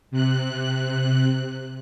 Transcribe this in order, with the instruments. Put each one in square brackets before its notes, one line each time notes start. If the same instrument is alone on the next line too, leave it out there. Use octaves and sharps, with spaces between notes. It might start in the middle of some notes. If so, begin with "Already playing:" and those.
[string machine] C3 F#6